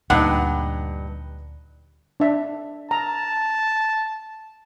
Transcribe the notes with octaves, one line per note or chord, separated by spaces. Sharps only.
D2 G2 A#2 D#4 F#5
D4 E5
A5 A#5